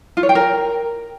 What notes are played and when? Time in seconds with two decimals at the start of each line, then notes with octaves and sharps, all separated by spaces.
0.17 F4
0.23 C#5
0.29 G5
0.35 A#4